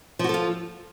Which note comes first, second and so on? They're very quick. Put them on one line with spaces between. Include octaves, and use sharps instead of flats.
F3 F#4 A4 F4